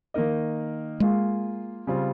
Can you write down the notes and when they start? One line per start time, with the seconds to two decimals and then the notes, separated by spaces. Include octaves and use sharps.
0.14 D#3 A#3 D#4 A#4 D#5
1.00 G#3 A#3 F4 G#4
1.87 C#3 G3 C4 F4